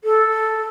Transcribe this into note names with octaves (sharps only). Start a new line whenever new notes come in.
A4